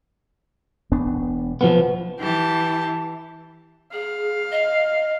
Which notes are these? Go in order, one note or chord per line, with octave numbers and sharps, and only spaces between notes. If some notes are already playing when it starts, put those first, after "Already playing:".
E1 B3 D4
F3 B3
E3 G4 A5
G#4 F5
D#5